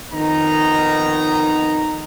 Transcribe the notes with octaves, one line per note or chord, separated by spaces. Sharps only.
F2 D#3 B3 D#4 A#5